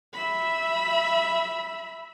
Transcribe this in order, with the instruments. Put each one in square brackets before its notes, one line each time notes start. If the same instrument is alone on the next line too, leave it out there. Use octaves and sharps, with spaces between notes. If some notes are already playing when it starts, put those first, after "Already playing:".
[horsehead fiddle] E5 B5